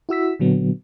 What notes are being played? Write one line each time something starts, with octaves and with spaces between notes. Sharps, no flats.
E4 F#4 E6 B6
A#2 D3 F#3 B3